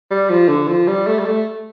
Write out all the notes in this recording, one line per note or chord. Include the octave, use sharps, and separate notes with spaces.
G3
F3
D3
F3
G3
A3
G3
A3